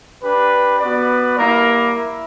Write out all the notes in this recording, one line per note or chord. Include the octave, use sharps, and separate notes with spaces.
D4 G4 B4
B3 F#4 B4 D5
G3 A#3 E4 A#4
E4